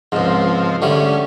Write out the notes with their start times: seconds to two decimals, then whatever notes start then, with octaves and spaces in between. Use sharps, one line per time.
0.12 C#2 G#2 F3 C4
0.82 D3 G3 A3 C#4